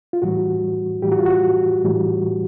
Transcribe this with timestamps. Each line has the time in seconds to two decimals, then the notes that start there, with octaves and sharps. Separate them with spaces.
0.13 F4
0.22 A2 E3 G3 F#4
1.02 A2 E3 G3 G4
1.11 F#4
1.19 F4
1.26 F#4
1.85 A2 E3 G3